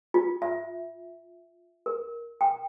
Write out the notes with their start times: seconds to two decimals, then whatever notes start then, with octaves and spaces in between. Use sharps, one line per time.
0.14 F4
0.42 E5
1.86 A#4
2.41 G5